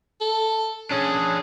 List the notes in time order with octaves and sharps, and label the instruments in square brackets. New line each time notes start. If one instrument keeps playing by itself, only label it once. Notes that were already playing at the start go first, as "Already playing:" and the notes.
[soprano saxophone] A4
[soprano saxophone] C#4 [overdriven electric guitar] D4 G#4